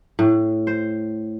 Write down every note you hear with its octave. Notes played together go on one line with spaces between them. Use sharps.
A2
C5